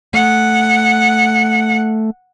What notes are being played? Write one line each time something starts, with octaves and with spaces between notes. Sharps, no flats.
A3 F#5